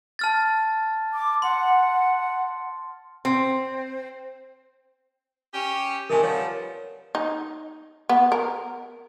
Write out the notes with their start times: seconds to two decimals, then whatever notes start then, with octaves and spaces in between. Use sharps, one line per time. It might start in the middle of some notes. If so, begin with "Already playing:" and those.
0.19 A5 F6 A6
1.13 D6
1.42 F#5 C6
3.25 C4
5.54 C#4 G4
6.10 C3 D#3 A3 A#4 G#5
6.23 F3 G3 B3 C#5
7.15 D#4
8.09 B3
8.32 A#4